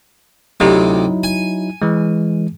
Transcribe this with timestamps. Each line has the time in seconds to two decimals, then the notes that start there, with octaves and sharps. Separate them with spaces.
0.60 D2 C3 F#3 D#4 E4
1.24 G#5
1.82 E3 G#3